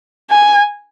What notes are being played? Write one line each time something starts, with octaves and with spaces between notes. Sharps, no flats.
G#5